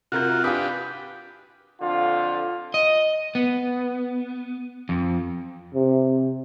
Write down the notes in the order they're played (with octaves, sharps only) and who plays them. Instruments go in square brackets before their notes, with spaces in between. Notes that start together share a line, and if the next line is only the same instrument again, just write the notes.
[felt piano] C3 A#4 G6 [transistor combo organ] F4 F#4
[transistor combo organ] D4 G4 B4 [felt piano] F4 G#5 D#6
[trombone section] F2 D3 F4
[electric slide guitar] D#5
B3
F2
[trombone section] C3